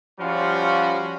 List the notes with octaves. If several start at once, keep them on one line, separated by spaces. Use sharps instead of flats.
F3 G3 C#4 F4 F#4